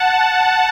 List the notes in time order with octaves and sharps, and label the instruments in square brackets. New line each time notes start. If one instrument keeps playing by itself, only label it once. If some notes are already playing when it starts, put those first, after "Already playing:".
Already playing: [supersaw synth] F#5 A5